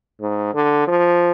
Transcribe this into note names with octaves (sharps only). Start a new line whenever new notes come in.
G#2
D3
F3